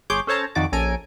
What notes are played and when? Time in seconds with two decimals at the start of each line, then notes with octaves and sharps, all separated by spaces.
0.10 G1 G#4 C#5 C6 D6 G6
0.27 C#4 A4 C5 C#5 A5 A#5
0.55 F2 D#3 D#4 F#4 D5 D6
0.72 A#1 C#4 A4 G#5 A#5 D7